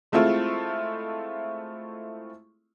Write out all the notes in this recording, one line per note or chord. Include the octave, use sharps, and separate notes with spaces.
G#3 A3 C4 E4 F4